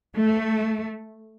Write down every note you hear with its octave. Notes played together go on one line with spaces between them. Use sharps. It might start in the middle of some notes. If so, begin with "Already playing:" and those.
A3